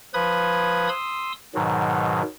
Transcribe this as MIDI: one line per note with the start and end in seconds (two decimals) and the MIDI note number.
0.14 0.89 53
0.14 0.89 71
0.14 0.89 83
0.14 0.89 87
0.14 0.89 92
0.89 1.32 84
0.89 1.32 87
0.89 1.32 88
1.55 2.22 44
1.55 2.22 47
1.55 2.22 51
1.55 2.22 54